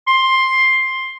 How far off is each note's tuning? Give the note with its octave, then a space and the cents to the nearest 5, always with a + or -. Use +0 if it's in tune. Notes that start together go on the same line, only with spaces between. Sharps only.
C6 +10